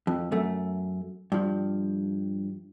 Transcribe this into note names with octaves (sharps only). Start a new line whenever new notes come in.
F2
F#2 A3
G2 F3